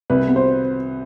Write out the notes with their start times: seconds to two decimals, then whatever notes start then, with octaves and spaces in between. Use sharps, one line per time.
0.10 C2 B4
0.28 B3
0.36 C5